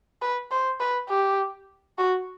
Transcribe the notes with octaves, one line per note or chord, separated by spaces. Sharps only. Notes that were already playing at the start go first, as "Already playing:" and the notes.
B4
C5
B4
G4
F#4